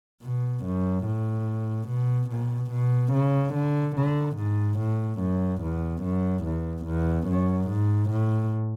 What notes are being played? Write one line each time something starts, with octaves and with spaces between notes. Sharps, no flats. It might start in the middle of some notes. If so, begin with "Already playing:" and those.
B2
F#2
A2
B2
B2
B2
C#3
D3
D3
G#2
A2
F#2
E2
F#2
E2
E2
F#2
G#2
A2